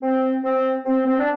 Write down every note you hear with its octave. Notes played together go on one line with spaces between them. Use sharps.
C4
C4
C4
C4
D4